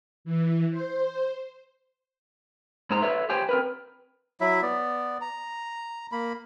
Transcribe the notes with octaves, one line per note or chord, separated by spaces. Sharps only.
E3
C5
G#2 G#3 C5 A#5
A4 B4 C#5 D5 E5
G4 C5 C#5 G5 G#5
C4 A#4 B4
F#3 E4 E5
B3 D5
A#5
A#3 B5